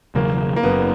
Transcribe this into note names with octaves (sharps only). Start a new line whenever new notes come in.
E1 E2 C#3 F#3 A#3
A#3
F#1 F#2 C#3 B3